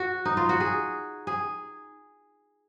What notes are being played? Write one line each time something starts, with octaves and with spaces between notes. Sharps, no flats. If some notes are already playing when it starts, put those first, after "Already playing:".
Already playing: F#4
D#4
F4
F#4
G#4
G#4